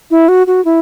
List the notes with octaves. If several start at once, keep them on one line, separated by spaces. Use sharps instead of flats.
E4
F#4
F#4
E4